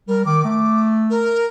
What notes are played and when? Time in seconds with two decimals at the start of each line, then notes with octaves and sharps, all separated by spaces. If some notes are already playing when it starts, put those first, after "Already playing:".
0.08 G3 A#4
0.26 D#3 D6
0.45 A3 D6
1.10 A#4